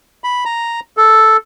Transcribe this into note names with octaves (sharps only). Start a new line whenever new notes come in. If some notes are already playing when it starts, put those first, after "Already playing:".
B5
A#5
A4